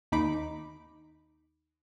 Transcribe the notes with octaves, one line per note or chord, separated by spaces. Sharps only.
D#2 D#4 B5 D6